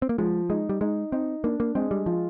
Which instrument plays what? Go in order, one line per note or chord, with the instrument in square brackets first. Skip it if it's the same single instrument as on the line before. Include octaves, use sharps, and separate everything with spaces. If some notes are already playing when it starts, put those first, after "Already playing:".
[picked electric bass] C4
A#3
[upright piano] F3 [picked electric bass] G#3
[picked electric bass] G#3 [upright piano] D#4
[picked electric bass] G3
[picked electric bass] G#3 [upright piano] D#4
[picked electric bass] C4 [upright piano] D#4
[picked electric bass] A#3 [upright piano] D4
[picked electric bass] A#3
[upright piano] G#3 [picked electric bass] C4
[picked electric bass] G3
[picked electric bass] F3 [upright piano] F4